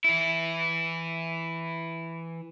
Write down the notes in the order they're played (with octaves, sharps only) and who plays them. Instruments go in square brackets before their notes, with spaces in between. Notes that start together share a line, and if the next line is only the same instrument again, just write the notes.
[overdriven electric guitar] E3 E4